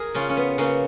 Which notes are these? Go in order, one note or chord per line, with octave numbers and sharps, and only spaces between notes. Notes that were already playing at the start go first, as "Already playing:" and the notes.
Already playing: G#4 A#4
C#3 C#4 F4
C#4
B3
C#3 A#3 C#4